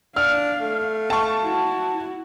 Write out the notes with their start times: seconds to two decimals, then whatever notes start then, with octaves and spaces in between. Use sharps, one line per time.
0.16 D4 F5 F6
0.60 A3
1.10 F5 A5 C#6
1.42 E4 F#4